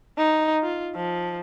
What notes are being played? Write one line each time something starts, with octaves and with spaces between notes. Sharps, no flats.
D#4
F4
F3